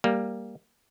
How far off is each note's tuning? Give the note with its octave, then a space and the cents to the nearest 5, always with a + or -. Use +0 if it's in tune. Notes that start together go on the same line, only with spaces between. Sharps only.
G3 +10 A#3 +0